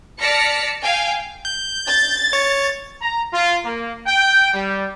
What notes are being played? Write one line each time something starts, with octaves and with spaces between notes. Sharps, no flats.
D5 A5 F6 A#6 B6 C#7
F5 G5 G#5
G6
A6
C#5
A#5
F4
A#3
G5
G3